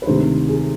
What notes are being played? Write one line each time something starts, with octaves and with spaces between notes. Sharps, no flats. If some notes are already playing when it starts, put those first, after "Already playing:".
B4
D2 C3 D#3 C5
G#4